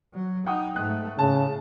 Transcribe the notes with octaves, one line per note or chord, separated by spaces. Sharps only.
F#3
D#4 F#5 G5 D#6
G#2 A3 F#6
A2 C#3 A5